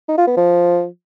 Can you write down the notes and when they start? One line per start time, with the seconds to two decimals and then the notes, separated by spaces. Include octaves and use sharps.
0.08 D#4
0.18 F4
0.27 B3
0.37 F3